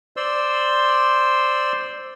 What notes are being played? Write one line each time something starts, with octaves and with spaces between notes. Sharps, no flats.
C5 D5 C6 E6